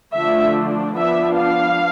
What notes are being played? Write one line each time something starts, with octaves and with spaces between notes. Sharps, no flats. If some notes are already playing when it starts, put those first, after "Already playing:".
D3 F3 A3 D4 E5
F3 B3 D4 E5
F5